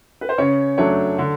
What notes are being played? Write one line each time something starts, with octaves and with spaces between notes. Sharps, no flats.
B4
C5
C#3 C#4 C#5
F#3 A3 C#4 D4 C#5
D3